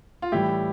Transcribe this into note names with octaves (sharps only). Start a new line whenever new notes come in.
F4
A2 E3 G3 E4 G4